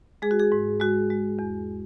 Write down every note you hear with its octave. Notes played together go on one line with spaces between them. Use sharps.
G#3 G#4
F#4
G#4
G#2
G#3 F#4
G#3
E2